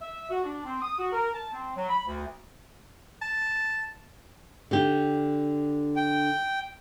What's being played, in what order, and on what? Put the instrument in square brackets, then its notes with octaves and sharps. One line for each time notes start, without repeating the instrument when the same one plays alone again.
[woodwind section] E5
F#4
D4
C4
D#6
F#4
A#4
A5
C4
F#3
B5
D2
[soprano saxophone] A5
[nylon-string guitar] D3 G4
[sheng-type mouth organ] G5